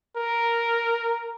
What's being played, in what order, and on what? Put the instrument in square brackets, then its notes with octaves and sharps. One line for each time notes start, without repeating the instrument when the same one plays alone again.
[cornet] A#4